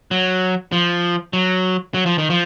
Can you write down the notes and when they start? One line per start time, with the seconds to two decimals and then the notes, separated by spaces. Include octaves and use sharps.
0.11 F#3
0.72 F3
1.33 F#3
1.94 F#3
2.06 F3
2.18 D#3
2.30 F3